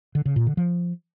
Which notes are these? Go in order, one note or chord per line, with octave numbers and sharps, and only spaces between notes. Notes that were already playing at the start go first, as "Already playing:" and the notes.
D3
C#3
A#2
D3
F3